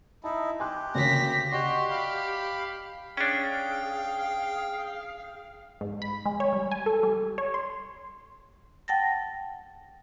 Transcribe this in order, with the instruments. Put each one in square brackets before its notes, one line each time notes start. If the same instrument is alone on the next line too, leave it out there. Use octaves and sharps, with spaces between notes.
[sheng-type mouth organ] D#4 E4 [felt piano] A5
[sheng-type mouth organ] G4 [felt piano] G#5 C6 F#6
[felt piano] D2 C#3 A#3 [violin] A#6 B6
[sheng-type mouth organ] F#4 C6 [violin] G4 [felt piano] D5 D#5
[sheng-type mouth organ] F5 B5
[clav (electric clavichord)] C#4 D4 [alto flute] G#4 [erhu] F5 [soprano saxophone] G5
[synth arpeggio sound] G#2
B5
G#3
C#5
G3
G#5
A4
G3
C#5
C6
[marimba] F#5 G5 A5 A6 A#6